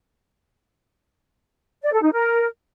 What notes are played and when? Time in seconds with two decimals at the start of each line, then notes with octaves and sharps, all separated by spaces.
1.83 D5
1.93 A4
2.03 D#4
2.13 A#4